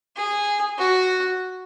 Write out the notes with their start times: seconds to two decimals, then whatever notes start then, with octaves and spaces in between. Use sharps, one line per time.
0.16 G#4
0.78 F#4